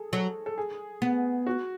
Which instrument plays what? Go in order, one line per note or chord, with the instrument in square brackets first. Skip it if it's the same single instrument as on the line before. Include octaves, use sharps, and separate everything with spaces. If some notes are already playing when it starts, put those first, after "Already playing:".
Already playing: [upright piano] G#4 A4
[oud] F#3 [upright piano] A4
[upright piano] A4
G#4
[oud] B3
[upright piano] F#4